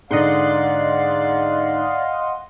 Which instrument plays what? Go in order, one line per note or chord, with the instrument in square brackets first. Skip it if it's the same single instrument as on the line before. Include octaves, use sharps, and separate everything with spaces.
[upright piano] G#2 D3 [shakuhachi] D5 [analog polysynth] D#5 F#5 C6 [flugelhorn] F5